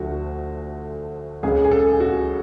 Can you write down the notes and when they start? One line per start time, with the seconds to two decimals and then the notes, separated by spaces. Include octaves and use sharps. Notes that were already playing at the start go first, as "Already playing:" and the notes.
Already playing: D2 D3 F3 A3 F#4
1.43 C#2 C#3 G#3 G#4
1.64 G#4
1.71 A4
1.93 G#4
2.00 F#4